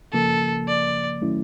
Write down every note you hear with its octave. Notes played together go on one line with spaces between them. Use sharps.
C#3 F3 A#3 A4
D5
D#3 F#3 A3 C#4 E4